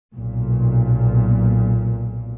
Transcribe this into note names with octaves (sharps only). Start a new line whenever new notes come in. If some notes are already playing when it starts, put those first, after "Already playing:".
B1 A#2